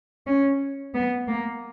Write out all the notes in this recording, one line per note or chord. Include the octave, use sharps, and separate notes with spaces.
C#4
B3
A#3